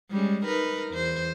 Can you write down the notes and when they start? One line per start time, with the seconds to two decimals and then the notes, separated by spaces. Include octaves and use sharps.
0.10 G3 G#3 C#4
0.44 D#4 A#4 B4
0.92 E2 C5